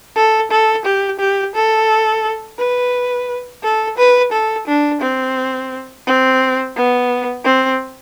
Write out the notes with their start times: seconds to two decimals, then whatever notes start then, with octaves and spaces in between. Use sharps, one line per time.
0.16 A4
0.51 A4
0.85 G4
1.19 G4
1.55 A4
2.59 B4
3.63 A4
3.98 B4
4.32 A4
4.67 D4
5.02 C4
6.07 C4
6.76 B3
7.45 C4